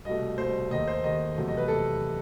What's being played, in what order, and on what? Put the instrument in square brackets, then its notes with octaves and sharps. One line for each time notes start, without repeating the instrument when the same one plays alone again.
[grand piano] C2 B2 A3 D#5
C2 B2 A3 C5
D#2 D#3 A3 D#5
C5
D#2 D#3 A3 D#5
E2 C3 F#3 A3
D#5
B4
C3 A4